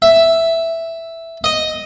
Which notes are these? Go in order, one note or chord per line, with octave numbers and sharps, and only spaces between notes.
E5
D#5